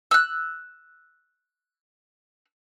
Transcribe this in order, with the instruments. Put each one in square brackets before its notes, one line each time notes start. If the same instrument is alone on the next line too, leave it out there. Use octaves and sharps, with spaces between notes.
[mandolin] E6 F#6